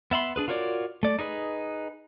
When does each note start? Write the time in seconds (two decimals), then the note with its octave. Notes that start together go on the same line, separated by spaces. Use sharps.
0.11 B3 E5 B5 C6
0.36 D4 G#4 B4
0.48 F4 F#4 A#4 C#5 D5
1.03 A3 D5
1.19 D#4 G#4 B4